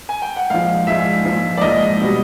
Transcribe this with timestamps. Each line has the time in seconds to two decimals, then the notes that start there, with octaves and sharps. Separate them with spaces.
0.09 G#5
0.22 G5
0.36 F#5
0.50 A#1 G#2 F3 F5
0.87 A#1 G#2 F3 E5
1.24 A#1 G#2 F3
1.57 D5
1.61 A#1 G#2 F3 D#5
2.01 B2 G3